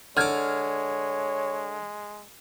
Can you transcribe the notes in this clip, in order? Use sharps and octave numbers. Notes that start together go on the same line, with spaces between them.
D3 G#3 C#5 D6 F6 G#6